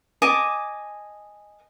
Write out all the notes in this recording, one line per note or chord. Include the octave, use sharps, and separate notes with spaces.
D#5 G#5 A5 D6